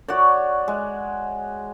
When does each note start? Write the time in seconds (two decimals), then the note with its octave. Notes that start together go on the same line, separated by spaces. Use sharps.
0.08 F#4 C#5 D5
0.68 G#3